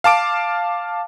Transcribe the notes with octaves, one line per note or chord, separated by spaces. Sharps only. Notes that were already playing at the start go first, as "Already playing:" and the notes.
F5 A5 D6 D7